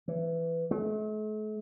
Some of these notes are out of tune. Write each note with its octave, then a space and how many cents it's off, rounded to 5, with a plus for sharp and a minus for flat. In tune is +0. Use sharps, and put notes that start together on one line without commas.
E3 +10
A3 -45